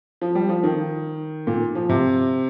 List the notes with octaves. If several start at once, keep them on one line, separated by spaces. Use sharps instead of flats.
F3
G3
F3
D#3
A#2
F3
C3